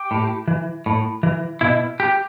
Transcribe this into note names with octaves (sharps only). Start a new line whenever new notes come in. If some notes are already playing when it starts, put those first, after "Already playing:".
Already playing: G4
A2
E3
A2
E3
B2 E4
G4